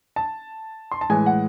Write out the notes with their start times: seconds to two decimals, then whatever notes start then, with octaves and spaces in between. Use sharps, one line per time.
0.16 A5
0.91 C6
1.01 A5
1.09 A2 E3 G#3 G#5
1.26 F#5